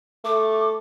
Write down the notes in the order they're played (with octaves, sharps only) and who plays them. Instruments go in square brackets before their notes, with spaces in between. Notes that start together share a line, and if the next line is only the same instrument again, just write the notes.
[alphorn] A3 [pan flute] D6